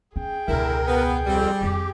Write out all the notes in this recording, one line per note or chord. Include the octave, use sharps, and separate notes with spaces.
C#4 G#4 G5
E1 C#2 D3 E4 A#4
B3
F2 G3 C4
F2 D#4 G4